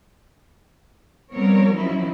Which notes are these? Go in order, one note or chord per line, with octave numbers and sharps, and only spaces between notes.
F3 G3 B3 C4 A#4 C#5
D#3 F3 F#3 C4 C#4 E4